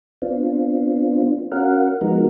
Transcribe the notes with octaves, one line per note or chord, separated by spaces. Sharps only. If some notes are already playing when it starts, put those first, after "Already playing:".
B3 C4 D4 F4
C#4 F#4 A#4 F5 F#5
F3 G#3 B3 D#4 F#4 A#4